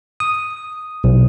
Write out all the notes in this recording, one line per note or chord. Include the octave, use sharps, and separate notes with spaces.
D#6
B1